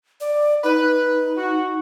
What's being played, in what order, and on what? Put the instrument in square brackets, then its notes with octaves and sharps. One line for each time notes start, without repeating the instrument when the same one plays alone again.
[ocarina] D5
[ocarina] D#4 [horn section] B4
[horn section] F#4